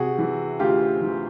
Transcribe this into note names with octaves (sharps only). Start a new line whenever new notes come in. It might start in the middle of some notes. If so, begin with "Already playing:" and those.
Already playing: C3 F#4 G#4
E3
D2 F4 G4
E3